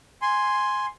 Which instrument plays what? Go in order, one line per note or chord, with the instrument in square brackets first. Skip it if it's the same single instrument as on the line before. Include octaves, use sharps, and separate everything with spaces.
[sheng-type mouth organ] G#5 C6